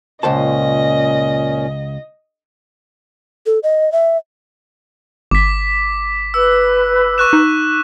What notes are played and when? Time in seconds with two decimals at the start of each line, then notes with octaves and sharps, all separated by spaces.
0.23 C#2 A#2 C#4 C5 D#5 A5
3.46 A4
3.63 D#5
3.92 E5
5.31 G1 D6 B6
6.34 B4 E6
7.18 C#6 F#6 E7
7.33 D#4